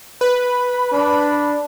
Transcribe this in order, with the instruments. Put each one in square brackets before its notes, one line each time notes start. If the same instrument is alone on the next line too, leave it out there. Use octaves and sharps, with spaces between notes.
[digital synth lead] B4 [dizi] B5
[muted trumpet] D4 [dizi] B5